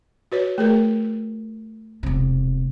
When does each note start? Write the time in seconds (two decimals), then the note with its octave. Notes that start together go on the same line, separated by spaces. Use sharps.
0.32 F#4 B4 C#5
0.58 A3 G#4 A#4
2.03 E1 C3